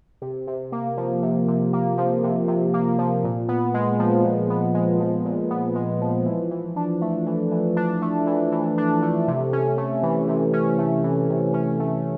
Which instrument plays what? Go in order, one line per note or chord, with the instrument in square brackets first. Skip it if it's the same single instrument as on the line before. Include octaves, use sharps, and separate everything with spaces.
[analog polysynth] C3
C3
A#3
F3
C3
C3
A#3
F3
C3
C3
A#3
F3
A#2
B3
G#3
F3
A#2
B3
G#3
F3
A#2
B3
G#3
F3
E3
E3
D4
A3
E3
E3
D4
A3
E3
E3
D4
A3
C3
C#4
A3
E3
C3
C#4
A3
E3
C3
C#4
A3